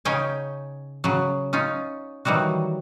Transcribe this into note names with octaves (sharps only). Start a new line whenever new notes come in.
C#3 C#4 D#4 G5 G#5
C#3 F#3
C#4 D#4 F4
D#3 E3 F#3 G3 F#4